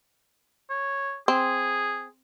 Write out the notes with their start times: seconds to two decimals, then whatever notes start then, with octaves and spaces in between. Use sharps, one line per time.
0.70 C#5
1.28 C4 G#4